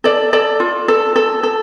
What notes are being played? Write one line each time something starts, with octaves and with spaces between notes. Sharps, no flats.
A4 D5
A4 D5
F4
A4
A4
A4